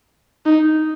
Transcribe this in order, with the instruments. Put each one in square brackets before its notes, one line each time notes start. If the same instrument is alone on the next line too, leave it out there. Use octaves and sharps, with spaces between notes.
[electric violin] D#4